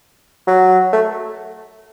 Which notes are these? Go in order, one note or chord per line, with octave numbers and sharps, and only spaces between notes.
F#3
A3